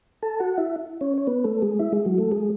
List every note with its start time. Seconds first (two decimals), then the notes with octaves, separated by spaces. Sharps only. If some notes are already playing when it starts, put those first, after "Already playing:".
0.22 A4 A5
0.40 F#4 F#5
0.57 E4 E5
1.01 C#4 C#5
1.18 C#5
1.27 B3 B4
1.44 A3 A4
1.62 G#3 G#4
1.79 E4 E5
1.92 G#3 G#4
2.05 F#3 F#4
2.18 A3 A4
2.32 G#3 G#4